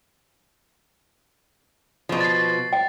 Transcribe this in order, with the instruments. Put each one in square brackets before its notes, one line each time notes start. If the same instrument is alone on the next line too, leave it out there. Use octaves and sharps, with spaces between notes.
[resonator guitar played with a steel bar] B2 F3
[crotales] A6 C7
[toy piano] G5